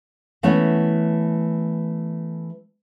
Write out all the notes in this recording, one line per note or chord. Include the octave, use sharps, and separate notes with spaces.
E3 A3 B3 C#4